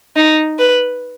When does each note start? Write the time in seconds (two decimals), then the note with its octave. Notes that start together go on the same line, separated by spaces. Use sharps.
0.16 D#4
0.59 B4